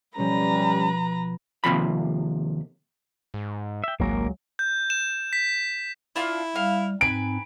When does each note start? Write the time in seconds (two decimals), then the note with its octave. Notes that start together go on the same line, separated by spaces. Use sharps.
0.18 B2 F3 G3 C#4 B4 A#5
1.64 D#2 A2 C3 F3 B5
3.34 G#2
3.84 E5 G5
4.00 G#1 C#2 F#3 G#3 A#3 A#4
4.59 G6
4.90 E7
5.33 B6
6.16 D4 E4 F4
6.56 G3 F5
7.01 G#2 C4 D#4 B4 G#5 B5 D7